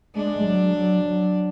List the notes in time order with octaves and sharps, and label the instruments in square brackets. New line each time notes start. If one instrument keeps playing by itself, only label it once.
[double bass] G#3 [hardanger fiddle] D4
[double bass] F#3
F#3
F#3